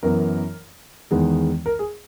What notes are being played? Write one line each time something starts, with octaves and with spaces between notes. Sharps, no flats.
F#2 E3 B3 A#4
E2 D#3 G#3 B3
A#4
G#4